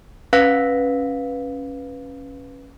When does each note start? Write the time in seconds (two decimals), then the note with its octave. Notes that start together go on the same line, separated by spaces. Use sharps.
0.33 C#4 B4 F5 B6